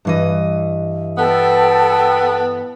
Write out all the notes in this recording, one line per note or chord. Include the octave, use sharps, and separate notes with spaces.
G2 E3 D#5
B3 A4 G5 A5